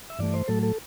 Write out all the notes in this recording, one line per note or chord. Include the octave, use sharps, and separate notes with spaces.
E5
G2 E3 A3 D5
C5
A2 F#3 A3 A4
A4